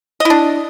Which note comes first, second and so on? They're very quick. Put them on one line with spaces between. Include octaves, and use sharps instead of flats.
D#5 E4 D4